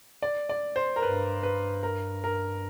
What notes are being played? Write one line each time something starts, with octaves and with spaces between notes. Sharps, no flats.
D5
D5
C5
A#4
G2 B4
B4
A#4
A#4